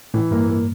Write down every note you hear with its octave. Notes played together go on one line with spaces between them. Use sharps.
A2 E3
G2 A#3
A#3